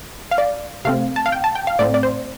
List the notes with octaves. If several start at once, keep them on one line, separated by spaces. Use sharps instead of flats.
F5
D5
C3 A3 C4 F5
A5
F5
G5
A5
G5
F5
A2 A3 C4 D5
D5
C5